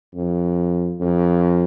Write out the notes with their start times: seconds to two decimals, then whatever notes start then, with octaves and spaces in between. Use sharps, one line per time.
0.15 F2
1.00 F2